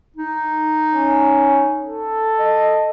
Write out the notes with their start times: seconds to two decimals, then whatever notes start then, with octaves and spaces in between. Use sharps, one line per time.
0.16 D#4
0.95 C#4
1.86 A4
2.39 D#5